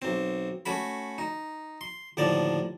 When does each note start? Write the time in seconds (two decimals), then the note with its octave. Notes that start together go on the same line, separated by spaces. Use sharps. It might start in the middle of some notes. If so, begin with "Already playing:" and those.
0.02 B1 C4
0.66 A3 C#4 F#4 B5
1.18 D#4
1.81 C6
2.17 D#2 A2 D3 F3 D5